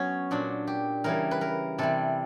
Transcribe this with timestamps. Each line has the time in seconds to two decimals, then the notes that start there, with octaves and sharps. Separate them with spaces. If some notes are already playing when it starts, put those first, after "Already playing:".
Already playing: F#3 B3 C#4
0.31 A#2 F#3 D4
0.67 G4
1.04 C#3 E3 G3 A#4
1.31 B4
1.41 A#4
1.78 C3 E3 G3 A4